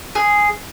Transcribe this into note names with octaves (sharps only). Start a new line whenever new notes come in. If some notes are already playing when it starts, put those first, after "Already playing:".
G#4